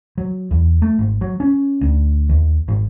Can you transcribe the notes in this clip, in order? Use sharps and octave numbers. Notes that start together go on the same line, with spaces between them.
F#3
E2
A3
G#1
F#3
C#4
D2
D#2
G#1